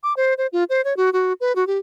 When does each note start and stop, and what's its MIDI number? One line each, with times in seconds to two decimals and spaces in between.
0.03 0.13 86
0.17 0.34 72
0.38 0.47 72
0.53 0.64 65
0.70 0.82 72
0.85 0.96 73
0.97 1.12 66
1.13 1.33 66
1.41 1.55 71
1.56 1.67 66
1.67 1.78 67